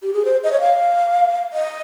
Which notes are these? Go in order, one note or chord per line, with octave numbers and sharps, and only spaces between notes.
G4
G#4
C5
D#5
C#5
F5
D#5